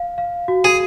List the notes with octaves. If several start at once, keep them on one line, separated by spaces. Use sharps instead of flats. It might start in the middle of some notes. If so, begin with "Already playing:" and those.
Already playing: F5
F5
F#4
G#4